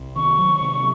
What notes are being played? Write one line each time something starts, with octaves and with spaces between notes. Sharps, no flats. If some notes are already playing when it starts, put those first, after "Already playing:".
Already playing: C2
D#3 C#6
F#3
C3